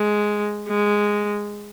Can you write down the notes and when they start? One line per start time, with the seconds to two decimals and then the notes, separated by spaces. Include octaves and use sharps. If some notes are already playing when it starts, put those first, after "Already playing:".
Already playing: G#3
0.68 G#3